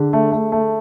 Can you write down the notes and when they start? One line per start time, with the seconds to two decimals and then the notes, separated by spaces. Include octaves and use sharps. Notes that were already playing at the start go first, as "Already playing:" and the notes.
Already playing: D3 G#4
0.13 A3
0.32 A3
0.52 A3